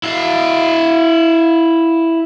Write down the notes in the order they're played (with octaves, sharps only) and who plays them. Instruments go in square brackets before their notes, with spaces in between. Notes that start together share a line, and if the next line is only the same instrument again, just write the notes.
[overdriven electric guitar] E4 F5